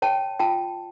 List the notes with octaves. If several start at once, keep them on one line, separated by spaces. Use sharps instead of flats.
C#5 G5 A5
F4 G5 A5